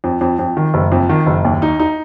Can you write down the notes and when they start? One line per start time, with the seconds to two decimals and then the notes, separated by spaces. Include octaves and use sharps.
0.04 F2
0.21 F2
0.39 F2
0.57 D#3
0.74 F#1
0.92 F2
1.09 D#3
1.26 F#1
1.45 D#2
1.62 D#4
1.80 D#4